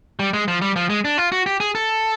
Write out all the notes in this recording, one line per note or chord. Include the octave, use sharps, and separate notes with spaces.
G3
G#3
F3
G3
F3
G#3
D4
F4
F#4
G4
G#4
A4